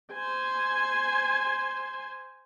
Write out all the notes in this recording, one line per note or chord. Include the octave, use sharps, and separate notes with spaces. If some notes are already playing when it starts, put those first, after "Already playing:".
C5 G#5